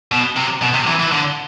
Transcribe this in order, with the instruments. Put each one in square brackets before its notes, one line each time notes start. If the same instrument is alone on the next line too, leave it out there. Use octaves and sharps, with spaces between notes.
[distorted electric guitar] B2
C3
B2
C3
E3
E3
D3